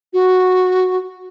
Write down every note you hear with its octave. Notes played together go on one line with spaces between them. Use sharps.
F#4